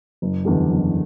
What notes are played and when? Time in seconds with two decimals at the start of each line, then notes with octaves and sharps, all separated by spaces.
0.22 F#1
0.45 E2 D3 G3
0.69 F#1